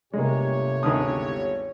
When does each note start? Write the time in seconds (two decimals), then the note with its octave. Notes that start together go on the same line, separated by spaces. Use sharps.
0.13 G1 C3 G#3 A#3 G4 C#5
0.83 G#1 D2 D#6